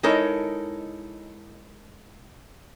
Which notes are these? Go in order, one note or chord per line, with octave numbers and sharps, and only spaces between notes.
G#3 D#4 E4 A4 A#4 C#5